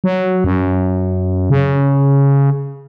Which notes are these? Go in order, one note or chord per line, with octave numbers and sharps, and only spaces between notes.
F#3
F#2
C#3